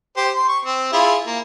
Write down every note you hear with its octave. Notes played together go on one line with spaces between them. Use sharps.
G4 C5
C6
C#6
C4
E4 F4 G#4
A#3